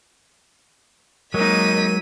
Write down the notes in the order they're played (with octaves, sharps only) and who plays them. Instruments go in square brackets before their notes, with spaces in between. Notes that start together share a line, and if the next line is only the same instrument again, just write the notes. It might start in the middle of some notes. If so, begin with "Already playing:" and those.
[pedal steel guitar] F#3 G#3 [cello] A#3 D#4 [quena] A#4 [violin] B6 D#7